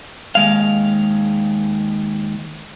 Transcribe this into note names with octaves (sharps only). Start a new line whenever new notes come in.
D#2 G#3 F5